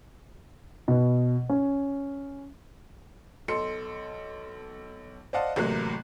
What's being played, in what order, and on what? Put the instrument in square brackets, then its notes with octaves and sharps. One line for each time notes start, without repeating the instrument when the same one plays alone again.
[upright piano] B2
C#4
[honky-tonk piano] B1 A4 C6 C#7
C5 D5 D#5 F5 F#5 A5
A1 C3 F#3 A3 A#3 F#6